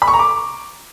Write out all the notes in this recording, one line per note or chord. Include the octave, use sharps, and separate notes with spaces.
B5
C#6
A#5
D6